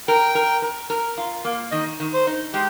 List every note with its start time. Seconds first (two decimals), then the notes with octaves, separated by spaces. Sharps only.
0.08 A#4 G5
0.35 A#4
0.62 A#4
0.90 A#4
1.18 F4
1.45 A#3
1.72 D#3 D#5
2.00 D#3
2.14 C5
2.27 D#4
2.53 G#3 G4